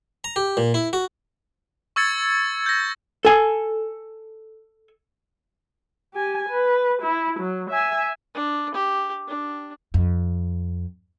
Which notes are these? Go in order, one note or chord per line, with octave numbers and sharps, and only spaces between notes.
A#5
G4
A#2
E4
F#4
C#6 E6 G#6 A6 C#7
G6 A#6
A4 G#5
G4 G#5
B4
E4
F#3
E5 G#5
D4
G4
D4
F2